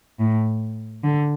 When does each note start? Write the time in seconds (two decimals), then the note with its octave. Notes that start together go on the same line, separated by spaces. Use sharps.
0.19 A2
1.04 D3